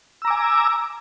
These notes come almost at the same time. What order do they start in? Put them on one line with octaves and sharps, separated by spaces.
E6 A#5 D6 G#5